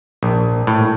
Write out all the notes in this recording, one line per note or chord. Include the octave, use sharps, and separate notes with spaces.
A#1
A2